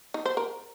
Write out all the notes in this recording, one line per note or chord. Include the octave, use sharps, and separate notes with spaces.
D#4
C5
A#4